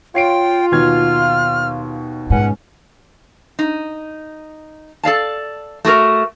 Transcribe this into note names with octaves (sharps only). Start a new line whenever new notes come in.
F4 C#5 G5 C7 D7
D#2 B2 F6 G#6
C#2 G#2 C#4 F#5
D#4
A4 D5 F5 A5
A3 F#4 G#4 A#4